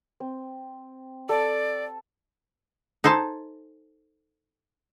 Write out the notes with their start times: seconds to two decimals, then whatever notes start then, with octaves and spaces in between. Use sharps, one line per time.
0.20 C4
1.29 A4 D5
3.04 D#4 A4 C5 G#5 A5